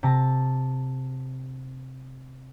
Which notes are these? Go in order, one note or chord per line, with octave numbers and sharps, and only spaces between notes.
C3 A5 A#6